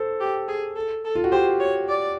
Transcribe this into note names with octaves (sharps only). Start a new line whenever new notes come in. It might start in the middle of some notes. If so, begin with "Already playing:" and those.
Already playing: A4 C5
G4
G#4
A4
A4
F4
F#4
G4 C5
C#5
D5